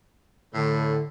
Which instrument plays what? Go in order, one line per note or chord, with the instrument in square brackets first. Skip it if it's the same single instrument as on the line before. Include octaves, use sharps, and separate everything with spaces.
[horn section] A2 [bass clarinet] D3